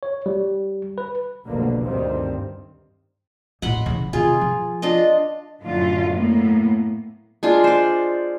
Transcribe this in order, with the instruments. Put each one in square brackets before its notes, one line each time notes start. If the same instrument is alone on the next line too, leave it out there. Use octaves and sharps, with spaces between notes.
[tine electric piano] C#5
G3
B4
[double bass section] F1 B1 B2 D3 A#3
D2 G2 D#3 G3 C4
[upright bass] E2 A2 [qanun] F#5 B5 C6
[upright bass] C#3 E3
[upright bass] C3 D#3 [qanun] F4 G#4
[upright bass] F3
[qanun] D4 F4 D#5
[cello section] F#2 A2 D3 F4
A2 A#3 B3
[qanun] G#3 D4 F4
C5 D5